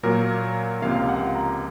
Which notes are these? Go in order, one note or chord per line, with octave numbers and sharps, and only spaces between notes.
A#2 F#3 A#3 A#4
C#2 C3 F3 A#3 F5
F#5
A#5